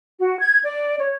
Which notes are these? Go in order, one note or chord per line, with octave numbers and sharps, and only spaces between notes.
F#4
G#6
D5
C#5